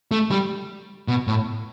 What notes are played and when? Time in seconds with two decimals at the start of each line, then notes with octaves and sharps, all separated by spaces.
0.11 A3
0.31 G3
1.08 B2
1.28 A2